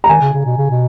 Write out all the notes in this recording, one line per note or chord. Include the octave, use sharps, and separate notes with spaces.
A#5
D#3 G#5
C#3
C#3
B2
C#3
B2